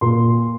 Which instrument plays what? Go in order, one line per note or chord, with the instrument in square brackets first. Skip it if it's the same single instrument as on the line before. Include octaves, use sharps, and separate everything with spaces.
[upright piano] A#2 C6